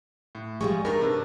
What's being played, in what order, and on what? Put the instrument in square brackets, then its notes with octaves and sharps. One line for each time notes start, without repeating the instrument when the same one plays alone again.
[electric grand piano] A2
[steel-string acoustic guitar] F3 G3 G#3 [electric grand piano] C#6
[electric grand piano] G2 D#4 C#6 [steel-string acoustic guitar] A#4 B4
[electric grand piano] C3 D4